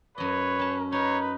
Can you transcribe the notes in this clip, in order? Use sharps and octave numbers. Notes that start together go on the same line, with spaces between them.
F#2 B4 C#5 D#5
C#4 A5
D#4 A#4 B4 C#5